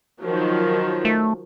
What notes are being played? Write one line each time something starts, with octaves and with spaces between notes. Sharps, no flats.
D#3 F3 F#3
A3